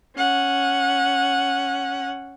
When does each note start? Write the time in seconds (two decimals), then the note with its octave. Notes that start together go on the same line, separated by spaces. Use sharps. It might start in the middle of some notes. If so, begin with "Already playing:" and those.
0.16 C#4 F#5